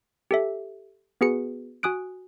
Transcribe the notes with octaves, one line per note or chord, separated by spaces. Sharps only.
G4 A4 E5
B3 F#4 G#4 B4 C#7
F#4 G#5 D#6 F#6 D7